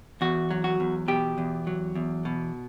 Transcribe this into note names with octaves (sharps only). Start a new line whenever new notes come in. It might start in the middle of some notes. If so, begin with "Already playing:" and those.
E2 F#4
F#3
F#4
E2
B2 G4
E2
F#3
E2
B2